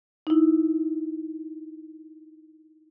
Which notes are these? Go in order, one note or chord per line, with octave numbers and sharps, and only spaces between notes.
D#4 E4